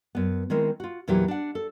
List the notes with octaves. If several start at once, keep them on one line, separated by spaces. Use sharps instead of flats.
F#2 B3
D#3 G#3 C4 E4 A#4 C#5
F4 F#4
E2 A#2 E3 F#3 G4 E5
D4 F#5
A4